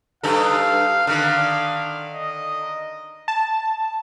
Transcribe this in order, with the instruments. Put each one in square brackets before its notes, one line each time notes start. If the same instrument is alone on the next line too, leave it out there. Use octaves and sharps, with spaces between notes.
[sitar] G2 D#4 A4 [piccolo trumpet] F5
[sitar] D3 D#3 [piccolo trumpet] F5
[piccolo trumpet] D#5
[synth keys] A5